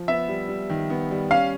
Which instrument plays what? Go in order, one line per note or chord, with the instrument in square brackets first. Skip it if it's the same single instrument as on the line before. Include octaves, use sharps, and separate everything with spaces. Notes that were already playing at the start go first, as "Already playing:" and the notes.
Already playing: [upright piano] F3
[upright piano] B3 [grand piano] E5
[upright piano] G3
G3
D#3
B3
G3
[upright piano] C#4 [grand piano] F5